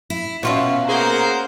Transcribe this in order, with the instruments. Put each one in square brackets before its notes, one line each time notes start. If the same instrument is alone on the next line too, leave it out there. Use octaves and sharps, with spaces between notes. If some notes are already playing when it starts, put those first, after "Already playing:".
[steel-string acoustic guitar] E4
[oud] B2 F4 [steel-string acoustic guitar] C#4 F#4 C#5 [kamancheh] E5 F5
[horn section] A#3 G#4 C5 [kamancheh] F#5 A#5